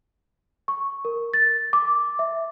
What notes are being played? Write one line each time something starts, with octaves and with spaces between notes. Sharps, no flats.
C#6
A#4
A6
D6
E5